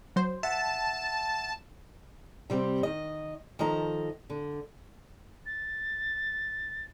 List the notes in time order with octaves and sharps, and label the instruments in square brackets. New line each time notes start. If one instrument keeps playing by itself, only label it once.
[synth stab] F#3 C5
[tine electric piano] E5 F#5 [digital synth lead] A5
[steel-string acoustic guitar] C3 G3 C4 G4
D#3 D#5
D#3 F3 A4 D#5 A#5
D3
[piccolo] A6